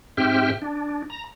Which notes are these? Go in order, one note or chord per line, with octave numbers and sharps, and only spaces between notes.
G#2 C4 G4 E5 G5 F6
D4
A#5